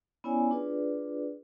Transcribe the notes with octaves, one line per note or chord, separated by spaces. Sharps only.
B3 C#4 E4 C#5 D5 G#5
D4 F4 G#4 B4 D5